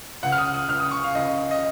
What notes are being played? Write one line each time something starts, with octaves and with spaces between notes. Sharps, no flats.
C#2 C#3 F#5
F6
D#6
D#6
C#2 C#3 F6
D#6
C#6
F5
C#2 C#3 D#5
D#5